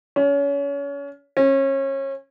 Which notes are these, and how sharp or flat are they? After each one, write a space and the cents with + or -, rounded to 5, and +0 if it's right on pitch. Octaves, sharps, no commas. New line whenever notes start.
C#4 +30
C#4 -30